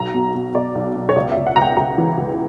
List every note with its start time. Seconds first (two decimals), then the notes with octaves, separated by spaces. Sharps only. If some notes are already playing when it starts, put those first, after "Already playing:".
Already playing: B1 A#5
0.14 B2
0.35 B2
0.54 B2 D5
0.75 B1
0.96 B2
1.09 C#5
1.16 C#2 D5
1.32 E5
1.37 C#2
1.47 F#5
1.56 C#2 A#5
1.62 G5
1.77 C#2 A#5
1.98 E3
2.17 C#2